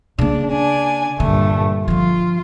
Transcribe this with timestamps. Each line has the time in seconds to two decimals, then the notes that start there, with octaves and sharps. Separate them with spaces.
0.19 C#3 A#3 D4
0.50 D4 G#5
1.20 G2 A#2 D3 A3
1.88 D3 F3 F4